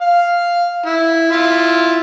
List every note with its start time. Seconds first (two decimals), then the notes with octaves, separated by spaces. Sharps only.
0.01 F5
0.85 E4
1.31 E4 F4